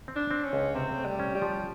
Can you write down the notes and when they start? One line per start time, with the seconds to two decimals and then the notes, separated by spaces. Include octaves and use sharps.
0.08 C4
0.16 D4
0.31 C4
0.44 C#4
0.53 C#2
0.75 C3 C4
0.97 A3
1.05 G3
1.19 C#4
1.35 G3
1.42 F3